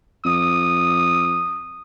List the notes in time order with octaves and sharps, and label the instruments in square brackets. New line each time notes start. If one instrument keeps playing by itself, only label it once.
[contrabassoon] F2 [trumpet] D#6